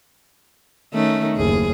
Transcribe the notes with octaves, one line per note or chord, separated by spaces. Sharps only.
D#3 A3 C#4
F#1 D#2 G#4